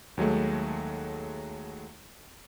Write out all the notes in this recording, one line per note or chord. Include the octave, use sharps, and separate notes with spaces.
D#2 F#3 G#3 A3